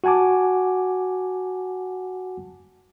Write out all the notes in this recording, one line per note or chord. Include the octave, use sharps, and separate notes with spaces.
F#4 F#5 G#5 A5 D6